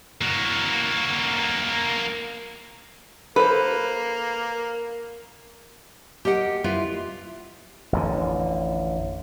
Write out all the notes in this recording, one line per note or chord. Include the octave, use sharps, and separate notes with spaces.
A#3 F#4
A#3 A4 B4 C5
G4 A#4 D#5 F#5
E4 F4 B4
A1 F2 D3